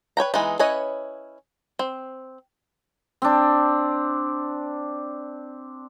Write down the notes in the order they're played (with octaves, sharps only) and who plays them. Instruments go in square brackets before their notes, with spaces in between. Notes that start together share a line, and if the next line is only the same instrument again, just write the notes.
[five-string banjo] B4 C#5 G5 A#5
E3 G#3 B3 D#4
C#4 E4 B4 C#5 D#5
C4
[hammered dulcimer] C4 D4